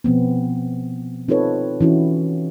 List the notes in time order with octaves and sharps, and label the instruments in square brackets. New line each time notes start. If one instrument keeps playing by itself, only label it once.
[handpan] B2 F3 B3 C4
C4 D#4 F4 A4 B4 C#5
E3 C#4 E4 F#4